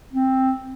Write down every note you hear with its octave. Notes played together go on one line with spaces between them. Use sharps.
C4